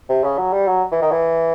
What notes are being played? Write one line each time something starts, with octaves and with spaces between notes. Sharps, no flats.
C3
C#3
F#3
G3
F#3
E3
D#3
E3